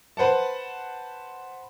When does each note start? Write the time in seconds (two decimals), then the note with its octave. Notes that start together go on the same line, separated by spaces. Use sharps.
0.17 B4 C5 F#5 A5